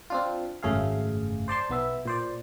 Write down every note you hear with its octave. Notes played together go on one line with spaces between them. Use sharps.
C4 D4 F4
G#1 F#2 C#3 A3 G#4 F5
C5 D5 A5 C6
B1 B3 E5
A#2 C5 D5